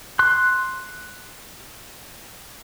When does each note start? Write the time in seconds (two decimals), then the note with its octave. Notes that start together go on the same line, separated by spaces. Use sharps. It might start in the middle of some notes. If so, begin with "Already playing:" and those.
0.19 C6 F#6